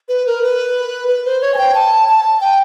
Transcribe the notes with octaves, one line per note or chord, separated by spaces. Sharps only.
B4
A#4
B4
B4
C5
C#5
G#5
G5
A5
A5
G5